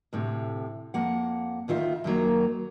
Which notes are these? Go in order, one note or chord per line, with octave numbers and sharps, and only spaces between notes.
D2 A2 C3
F2 A#3 F#5
D2 D#3 F4 D5 E5
F#2 D#3 F#3 A#3